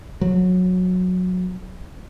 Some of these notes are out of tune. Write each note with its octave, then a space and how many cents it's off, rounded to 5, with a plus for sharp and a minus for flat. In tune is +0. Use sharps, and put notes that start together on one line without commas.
F#3 -20